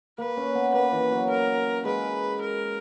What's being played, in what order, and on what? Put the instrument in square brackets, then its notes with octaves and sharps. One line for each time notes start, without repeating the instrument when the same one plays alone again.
[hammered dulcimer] A#3 [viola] B4
[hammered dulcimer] C#4
B3
[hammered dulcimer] A#3 [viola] B4
[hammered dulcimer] E3
F#3
[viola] A#4
[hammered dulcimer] G#3 [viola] B4
[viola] A#4